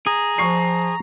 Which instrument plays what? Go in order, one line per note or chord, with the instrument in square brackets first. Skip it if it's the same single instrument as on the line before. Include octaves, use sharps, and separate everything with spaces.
[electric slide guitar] G#4 [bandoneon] A#5
[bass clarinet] F3 [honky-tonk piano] C#6 C7